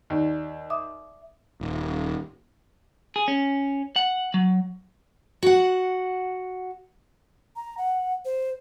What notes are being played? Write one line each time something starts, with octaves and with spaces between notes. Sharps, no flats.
D#2 D5
E5 D6 D#6
D#1
G#4
C#4
F#5
F#3
F#4 F#5
A#5
F#5
C5